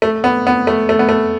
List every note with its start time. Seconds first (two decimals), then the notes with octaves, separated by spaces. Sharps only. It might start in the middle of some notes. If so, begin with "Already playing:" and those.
0.02 A3
0.24 B3
0.47 B3
0.67 A3
0.89 A3
0.99 B3
1.09 A3